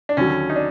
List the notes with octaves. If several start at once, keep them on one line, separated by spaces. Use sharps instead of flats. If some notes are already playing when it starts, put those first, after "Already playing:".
D4
D#2 D3 F#3 C#4
D#4
D4